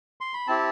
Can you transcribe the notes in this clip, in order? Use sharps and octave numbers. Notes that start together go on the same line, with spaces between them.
C6
B5
C4 E4 G4 A5